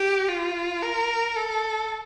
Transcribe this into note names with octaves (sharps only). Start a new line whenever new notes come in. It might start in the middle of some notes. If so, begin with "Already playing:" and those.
Already playing: G4
F4
A#4
A4